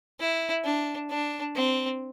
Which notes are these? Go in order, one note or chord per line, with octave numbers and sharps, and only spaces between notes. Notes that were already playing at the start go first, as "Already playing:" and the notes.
E4
D4
D4
C4